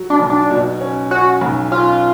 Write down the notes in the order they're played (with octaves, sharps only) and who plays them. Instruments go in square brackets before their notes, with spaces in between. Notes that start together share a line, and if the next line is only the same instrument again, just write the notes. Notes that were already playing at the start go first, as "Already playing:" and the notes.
Already playing: [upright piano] F#3
[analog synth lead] D4
[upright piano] B1
[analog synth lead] D4
[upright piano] B2
C#4
[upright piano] C#4 [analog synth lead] F#4
[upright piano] B1
[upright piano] C#4 [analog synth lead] F4